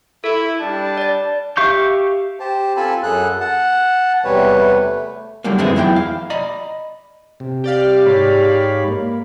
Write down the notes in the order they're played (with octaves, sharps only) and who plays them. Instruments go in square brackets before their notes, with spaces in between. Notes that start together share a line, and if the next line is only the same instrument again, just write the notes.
[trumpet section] E4 [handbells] A4
[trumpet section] G3 D4 A5
[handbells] D5 A6
[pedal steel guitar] G4 E5 F5 C#6 G6
[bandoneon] G4 C5 A5
C4 F4 A4 G#5 A5 B5
F#2 G#4 A4 F#6
F#5 A5
E2 C3 E3 G3 B4 C#5
A3
[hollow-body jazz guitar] D3 F#3 G3 A3 A#3
F#2 D3 G#3 B3 C4 E4
E2 F#3 E4 E5 G5
F5
D5 D#5 A#5 B5
[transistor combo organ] C3
[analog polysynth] G4 D5 F5
[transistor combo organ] G#2 C#5 B5
A#3